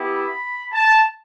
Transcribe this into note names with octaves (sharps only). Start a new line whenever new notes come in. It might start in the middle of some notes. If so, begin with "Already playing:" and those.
Already playing: B3 E4 G4
B5
A5